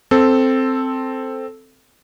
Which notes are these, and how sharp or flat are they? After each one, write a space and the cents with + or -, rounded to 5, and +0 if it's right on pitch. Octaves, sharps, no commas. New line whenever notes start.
C4 +0 A4 +0